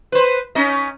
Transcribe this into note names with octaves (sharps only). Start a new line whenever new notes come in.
B4 C5
C#4 D#4 D#5